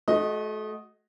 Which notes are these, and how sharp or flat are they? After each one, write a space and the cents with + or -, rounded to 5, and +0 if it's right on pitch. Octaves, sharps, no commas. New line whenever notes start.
A3 -35 F#4 +0 D#5 +0